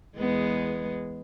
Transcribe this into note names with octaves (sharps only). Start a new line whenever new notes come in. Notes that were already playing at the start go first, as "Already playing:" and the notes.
E2 G#3 B3